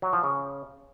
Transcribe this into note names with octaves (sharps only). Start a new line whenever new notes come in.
F#3
F3
C#3